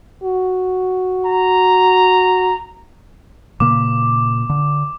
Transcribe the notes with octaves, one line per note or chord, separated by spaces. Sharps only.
F#4
A#5
A#2 C#3 A#3 D6
D3